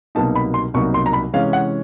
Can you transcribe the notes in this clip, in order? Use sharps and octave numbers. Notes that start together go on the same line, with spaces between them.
C2 B2 F#3 A#3 D#4 A5
B5
C6
C2 B2 F#3 A#3 D#4 C#6
C6
A#5
B5
C3 E3 G#3 C#4 F5
F#5